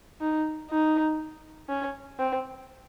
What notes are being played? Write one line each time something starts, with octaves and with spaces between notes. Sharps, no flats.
D#4
D#4
C#4
C4